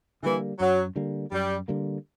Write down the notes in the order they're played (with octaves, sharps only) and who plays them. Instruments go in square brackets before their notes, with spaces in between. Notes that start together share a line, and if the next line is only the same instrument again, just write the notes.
[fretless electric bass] D3 G3 A#3 [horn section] E3
[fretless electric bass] F#2 [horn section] F#3
[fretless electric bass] D3 G3 A#3
[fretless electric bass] F#2 [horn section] G3
[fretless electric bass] D3 G3 A#3